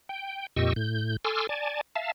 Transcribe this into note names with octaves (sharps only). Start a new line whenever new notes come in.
G5
F2 A#2 G4 D#5 C#6 E6
A2 G6
A4 G#5 C6 D6 E6 F6
D5 G#5 A5
E5 F5 A5